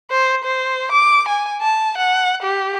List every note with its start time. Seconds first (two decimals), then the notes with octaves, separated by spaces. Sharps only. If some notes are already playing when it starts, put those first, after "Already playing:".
0.11 C5
0.44 C5
0.92 D6
1.28 G#5
1.61 A5
1.97 F#5
2.42 G4